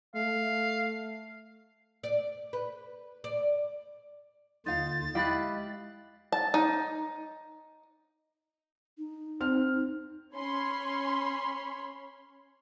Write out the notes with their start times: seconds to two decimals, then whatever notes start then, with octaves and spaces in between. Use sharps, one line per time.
0.15 A3 F5
2.03 D5
2.53 B4
3.24 D5
4.66 D#2 D3 D#4 F4 F5 A6
5.15 G#3 E4 G4 D#5 F5 B5 F#6
6.32 A5
6.54 D#4
8.98 D#4
9.40 C4 F6
10.36 C#4 C#5 B5 C6